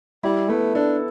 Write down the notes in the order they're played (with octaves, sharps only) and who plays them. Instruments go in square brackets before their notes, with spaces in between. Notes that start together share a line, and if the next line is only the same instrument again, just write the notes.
[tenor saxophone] G3 [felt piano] E4
[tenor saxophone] A3 [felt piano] B3
[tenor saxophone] D4 [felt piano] A4